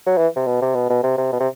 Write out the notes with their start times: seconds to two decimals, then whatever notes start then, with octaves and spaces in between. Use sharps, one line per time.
0.07 F#3
0.17 E3
0.36 C3
0.47 B2
0.61 C3
0.75 B2
0.89 B2
1.03 C3
1.18 C3
1.33 B2
1.40 C3